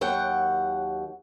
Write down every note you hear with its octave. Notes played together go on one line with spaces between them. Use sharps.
D#2 F#3 F#5 G5